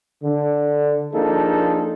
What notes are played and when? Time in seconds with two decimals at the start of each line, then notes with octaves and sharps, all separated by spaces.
0.24 D3
1.13 F3 A#3 D4 D#4 G#4 A4